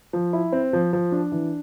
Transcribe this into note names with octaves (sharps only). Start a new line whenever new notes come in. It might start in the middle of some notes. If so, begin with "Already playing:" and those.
F3
E4
C4
F3
F3
D4
E3